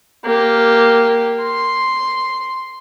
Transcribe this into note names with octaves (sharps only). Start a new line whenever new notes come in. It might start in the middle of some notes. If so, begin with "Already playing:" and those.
A#3 G4
C6